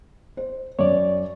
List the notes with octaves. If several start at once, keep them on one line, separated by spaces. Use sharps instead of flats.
C5
F#2 C#5 D5